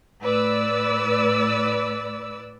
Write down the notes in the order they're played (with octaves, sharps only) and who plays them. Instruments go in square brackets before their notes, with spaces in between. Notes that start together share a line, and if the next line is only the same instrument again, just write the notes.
[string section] A2 B4 D5 E6